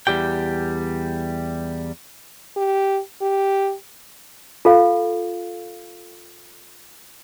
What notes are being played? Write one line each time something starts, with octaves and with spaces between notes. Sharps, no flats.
E2 G3 G4 G5
G4
G4
F4 A4 F5